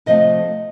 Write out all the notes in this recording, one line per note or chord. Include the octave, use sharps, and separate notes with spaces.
C3 F3 A3 D#5